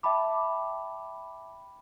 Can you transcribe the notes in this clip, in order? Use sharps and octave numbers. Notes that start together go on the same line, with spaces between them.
E5 G5 A5 B5 D6